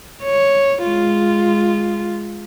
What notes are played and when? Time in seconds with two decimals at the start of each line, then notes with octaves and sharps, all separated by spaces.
0.23 C#5
0.84 G#3 F4